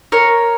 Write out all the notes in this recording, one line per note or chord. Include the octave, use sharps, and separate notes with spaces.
A#4 C#5